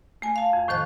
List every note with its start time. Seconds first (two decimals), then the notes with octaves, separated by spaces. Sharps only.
0.22 A3 G#5
0.36 F5 A5
0.53 F2
0.68 A2 D#3 F3 C5 F#6